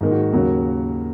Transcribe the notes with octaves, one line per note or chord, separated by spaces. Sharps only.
G#2 D#3 A#3
F#4
D#2 C#3 F#3 A#3 F#4